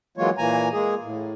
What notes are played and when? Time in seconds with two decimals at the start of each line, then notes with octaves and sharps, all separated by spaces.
0.17 E3 F#3 G#3 A#3 F4 C#5
0.38 A#2 E3 A#3 G#5 A#5
0.73 G#3 A#3 G#4
1.02 A2